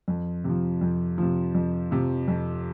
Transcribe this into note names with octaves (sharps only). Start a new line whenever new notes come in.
F2
C3 F3
F2
C3 F3
F2
C3 F3
F2